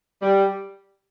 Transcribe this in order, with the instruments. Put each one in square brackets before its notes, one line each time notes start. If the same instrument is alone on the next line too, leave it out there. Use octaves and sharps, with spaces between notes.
[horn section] G3